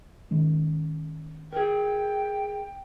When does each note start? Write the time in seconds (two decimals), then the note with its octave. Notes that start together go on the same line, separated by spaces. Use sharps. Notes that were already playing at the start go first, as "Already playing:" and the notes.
0.31 D#3 G#3 C#4
1.53 G#4 A#4 G5